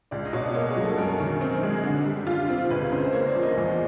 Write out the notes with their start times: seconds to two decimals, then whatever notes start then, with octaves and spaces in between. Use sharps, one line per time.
0.11 C#2 D5
0.26 D#5
0.33 B2 C#5
0.40 D5
0.55 A#3 C#5
0.69 G#4
0.76 F#3
0.84 A4
0.98 F#2 A#4
1.20 D#3
1.41 C4
1.63 G#3
1.84 D3
2.05 G3
2.27 F4
2.49 C4
2.70 C#2 B4
2.92 C#3 C5
3.05 C5
3.13 A#3 C#5
3.28 D5
3.35 F3
3.42 D#5
3.57 E2